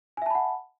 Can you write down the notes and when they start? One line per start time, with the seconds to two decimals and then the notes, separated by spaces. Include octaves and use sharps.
0.17 G#5
0.22 E5
0.26 A5
0.30 B5
0.35 F#5